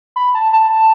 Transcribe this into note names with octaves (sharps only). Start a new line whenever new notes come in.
B5
A5
A5